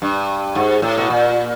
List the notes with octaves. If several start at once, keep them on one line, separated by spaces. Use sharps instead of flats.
G2
G#2
A2
B2
A#2